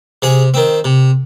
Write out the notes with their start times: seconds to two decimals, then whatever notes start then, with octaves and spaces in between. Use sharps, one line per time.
0.22 C3 G#4
0.54 D#3 C4
0.85 C3